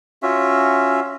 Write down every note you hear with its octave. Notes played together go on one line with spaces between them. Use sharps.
C#4 F4 F#4 E5